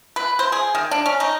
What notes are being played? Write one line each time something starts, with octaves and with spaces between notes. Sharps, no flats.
B4
C5
G#4
D#3
D4
C#4
D#4